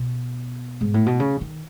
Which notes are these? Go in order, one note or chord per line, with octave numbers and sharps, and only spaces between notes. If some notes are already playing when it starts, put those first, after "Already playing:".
Already playing: B2
G#2
A2
B2
C#3
D#3